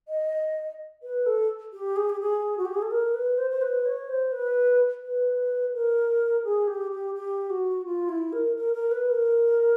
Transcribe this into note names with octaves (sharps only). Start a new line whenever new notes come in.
D#5
B4
A4
G4
G#4
G4
G#4
F#4
G4
G#4
A4
A#4
B4
C5
C5
B4
C#5
C5
B4
B4
A#4
G#4
G4
G4
G4
F#4
F4
E4
A#4
A#4
A#4
B4
A#4